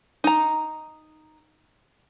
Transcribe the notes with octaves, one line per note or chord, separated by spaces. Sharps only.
D#4 A#5